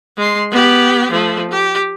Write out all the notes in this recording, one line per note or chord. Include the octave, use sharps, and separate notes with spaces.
G#3 C6
B3 G4
F3 A3
G4